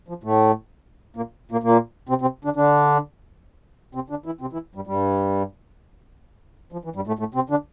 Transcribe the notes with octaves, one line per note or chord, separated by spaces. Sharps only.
F3
A2 A3
A#2 A#3
A#2 A#3
A#2 A#3
C3 C4
C3 C4
D3 D4
D3 D4
C3 C4
D3 D4
E3 E4
C3 C4
E3 E4
G2 G3
G2 G3
F3
E3
G2 G3
A2 A3
A2 A3
C3 C4
D3 D4